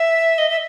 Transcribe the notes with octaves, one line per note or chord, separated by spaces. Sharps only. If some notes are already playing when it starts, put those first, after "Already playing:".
Already playing: E5
D#5
E5